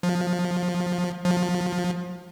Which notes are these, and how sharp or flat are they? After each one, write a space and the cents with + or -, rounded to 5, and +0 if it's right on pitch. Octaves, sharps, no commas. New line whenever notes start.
F3 +20
F3 +25